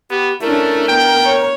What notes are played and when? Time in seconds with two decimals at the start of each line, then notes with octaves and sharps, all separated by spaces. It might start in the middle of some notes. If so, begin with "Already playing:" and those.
0.10 B3 G4
0.41 A3 C#4 D4 E4 A#4
0.88 B3 G5
1.25 C#5